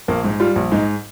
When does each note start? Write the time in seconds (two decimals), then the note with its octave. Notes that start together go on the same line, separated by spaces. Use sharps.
0.08 A#1 A#3
0.24 G#2
0.40 G3 F4
0.56 A#1
0.72 G#2 D#4